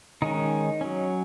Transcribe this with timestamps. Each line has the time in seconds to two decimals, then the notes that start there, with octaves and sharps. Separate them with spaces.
0.22 D#3 G#3 C#4 D#4
0.81 F#3 C#4